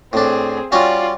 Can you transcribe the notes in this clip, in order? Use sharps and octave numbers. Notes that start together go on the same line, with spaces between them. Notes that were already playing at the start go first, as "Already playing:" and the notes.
A2 C4 D4 G#4
G3 C#4 F4 F#4 D5